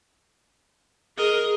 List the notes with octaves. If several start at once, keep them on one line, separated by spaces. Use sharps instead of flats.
G#4 A#4 D#5